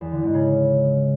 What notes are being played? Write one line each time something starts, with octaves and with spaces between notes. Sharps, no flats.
E2
D3
G#2
C#3